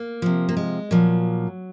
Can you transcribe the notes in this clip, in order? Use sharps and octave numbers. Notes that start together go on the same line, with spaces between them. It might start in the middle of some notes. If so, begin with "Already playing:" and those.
Already playing: A#3
C3 F3
A#3
G#3
A#2 F3 F#3